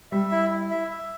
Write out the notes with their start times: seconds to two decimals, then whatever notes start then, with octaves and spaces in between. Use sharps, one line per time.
0.11 G3 E5
0.31 E4
0.51 E4
0.71 E5
0.91 E5